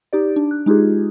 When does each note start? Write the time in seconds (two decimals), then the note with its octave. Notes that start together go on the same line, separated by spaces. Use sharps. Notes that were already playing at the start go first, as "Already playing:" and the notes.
0.13 D#4 G4 D5
0.36 D4
0.51 F#6
0.66 G#3 D#4 F4 G4 G#4